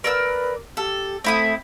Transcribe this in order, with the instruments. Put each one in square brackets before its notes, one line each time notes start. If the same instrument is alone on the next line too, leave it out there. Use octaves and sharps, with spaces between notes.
[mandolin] A#4 D5 E6 [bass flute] B4
[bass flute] G4 [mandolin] A4
[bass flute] A3 [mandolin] C4 E4 D#6